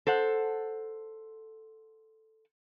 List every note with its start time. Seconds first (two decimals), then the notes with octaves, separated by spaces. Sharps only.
0.07 A4 C5 F#5